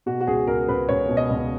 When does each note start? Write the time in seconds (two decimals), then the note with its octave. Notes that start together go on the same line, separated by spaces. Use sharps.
0.06 B2 F#4
0.21 F#4
0.27 C#2 G#4
0.47 C#2 A#4
0.68 C#2 B4
0.89 C#2 C#5
1.09 B2
1.17 D#5
1.30 C#2